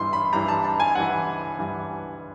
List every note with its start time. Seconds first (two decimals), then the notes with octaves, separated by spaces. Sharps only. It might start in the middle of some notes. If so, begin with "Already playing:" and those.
Already playing: G2 E3 C6
0.13 B5
0.33 G2 E3 A#5
0.48 A5
0.64 A5
0.80 G#5
0.95 G2 E3 F#5
1.59 G2 E3